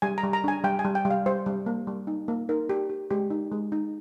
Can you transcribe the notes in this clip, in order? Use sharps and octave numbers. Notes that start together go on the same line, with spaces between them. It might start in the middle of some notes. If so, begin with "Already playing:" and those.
G3 G#5
A#5
G3
A#5
D4 G#5
G3 G5
G#5
G3
G5
G3
F5
G3 C5
G3
A#3
G3
D#4
A#3
D#4 A#4
G4
G4
G#3 G4
D#4
G#3
D#4